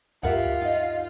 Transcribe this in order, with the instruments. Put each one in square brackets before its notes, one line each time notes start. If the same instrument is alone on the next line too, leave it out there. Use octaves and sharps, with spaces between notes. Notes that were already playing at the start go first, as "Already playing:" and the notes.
[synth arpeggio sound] D2 G2 A#4 [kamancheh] F4 [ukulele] G4 E5 F#5
[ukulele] D#4 D#5